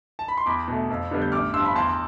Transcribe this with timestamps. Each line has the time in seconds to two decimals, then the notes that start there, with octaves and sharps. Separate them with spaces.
0.19 A5
0.28 B5
0.38 C6
0.46 E2 B5 D6
0.68 B2 A3
0.90 F2
1.11 D3 G3 B3 D4
1.22 G6
1.32 A1 D6 F6
1.53 G2 F3 C6 E6
1.65 B5
1.75 E2 A5 C6